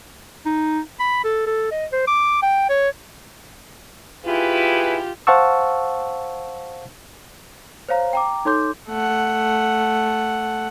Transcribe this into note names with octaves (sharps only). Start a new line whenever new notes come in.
D#4
B5
A4
A4
D#5
C5
D6
G5
C#5
E4 F4 G4 G#4 B4
C5 F5 F#5 A5 C#6 E6
C5 C#5 F5 A#5
G5 A#5 D6
D#4 A4 C#5 C6 D6 G6
A3 F#5